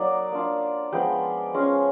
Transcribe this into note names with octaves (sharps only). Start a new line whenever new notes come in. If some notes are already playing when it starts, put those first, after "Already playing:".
Already playing: F#3 A#3 D#4 D5
A#3 D4 F4
F3 G#3 B3 G5
G#3 C#4 F4